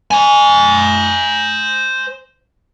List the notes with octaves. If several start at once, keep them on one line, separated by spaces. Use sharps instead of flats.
C5 G#5